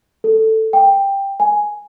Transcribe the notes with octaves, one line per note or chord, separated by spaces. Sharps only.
A4
G5
G#5